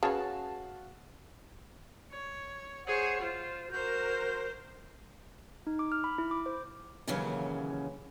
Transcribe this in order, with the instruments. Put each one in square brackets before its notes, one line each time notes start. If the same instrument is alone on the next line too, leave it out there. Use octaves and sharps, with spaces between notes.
[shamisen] C#3 [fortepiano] F#4 F5 A5 [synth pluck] G#4 B4 C#5
[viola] C#5
[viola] G#4 C#5 [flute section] C5 F#5
[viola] F4 [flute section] C5
[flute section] F#4 G6 [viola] A#4 C5
[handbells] D#4
D6
F6
B5
E4
D6
C5
[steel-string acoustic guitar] D#2 A#2 C#3 E3 F#3 C#4